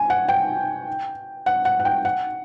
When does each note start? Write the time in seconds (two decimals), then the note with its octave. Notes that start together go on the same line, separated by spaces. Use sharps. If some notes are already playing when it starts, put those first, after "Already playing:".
Already playing: G#5
0.10 F#5
0.28 G5
1.46 F#5
1.65 F#5
1.80 F#5
1.85 G5
2.05 F#5